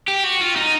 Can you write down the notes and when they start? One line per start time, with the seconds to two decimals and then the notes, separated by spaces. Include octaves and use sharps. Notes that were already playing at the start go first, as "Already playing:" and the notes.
0.08 G4
0.24 F#4
0.41 F4
0.56 D#4